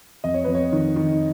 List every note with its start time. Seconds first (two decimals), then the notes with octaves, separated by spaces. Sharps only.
0.24 F2 D#5
0.34 C#5
0.44 F2 B4
0.55 C#5
0.72 D#3
0.96 D#3